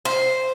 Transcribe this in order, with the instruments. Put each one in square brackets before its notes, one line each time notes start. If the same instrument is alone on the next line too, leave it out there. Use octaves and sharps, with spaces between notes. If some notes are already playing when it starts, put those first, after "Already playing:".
[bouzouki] C5